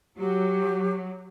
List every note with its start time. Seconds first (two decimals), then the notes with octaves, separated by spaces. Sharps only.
0.18 F#3 G4